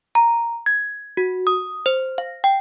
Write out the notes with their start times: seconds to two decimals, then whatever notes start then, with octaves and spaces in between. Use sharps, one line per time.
0.15 A#5
0.66 G#6
1.17 F#4
1.47 D#6
1.86 C5
2.18 F5
2.44 G5